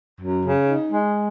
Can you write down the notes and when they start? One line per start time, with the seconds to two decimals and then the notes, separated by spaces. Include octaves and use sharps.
0.20 F#2
0.43 C#3
0.67 D#4
0.91 G#3